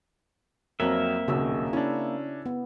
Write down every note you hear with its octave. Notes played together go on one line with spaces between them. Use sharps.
F2 F#3 A#3 C4 A#4 E5
D#1 B1 C#3 F#4 E6
C#4 D4 E4
B3